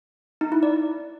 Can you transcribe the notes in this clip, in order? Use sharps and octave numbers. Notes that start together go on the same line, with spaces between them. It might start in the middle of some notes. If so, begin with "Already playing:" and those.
D#4
E4
D5